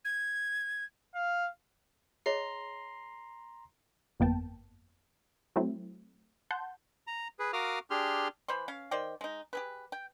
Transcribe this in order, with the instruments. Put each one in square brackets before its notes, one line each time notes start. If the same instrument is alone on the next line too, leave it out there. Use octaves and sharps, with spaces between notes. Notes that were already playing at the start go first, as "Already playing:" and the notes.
[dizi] G#6
[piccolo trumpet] F5
[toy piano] G#4 C#5 D#5 [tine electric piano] A#5 C6 C7
[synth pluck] G1 F2 A#3 B3 G5 A5
F#3 A3 C4 E4
F#5 A5 C6 G6
[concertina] A#5
G#4 B4
F#4 A#4 F5 D6 D#6 F6
D4 G4 G#4 C6 F6
[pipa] E3 C5 B5 C6
C#4 F5
D#3 C5 D5 G5
G#3 D#4
G4 G#4 B4
G5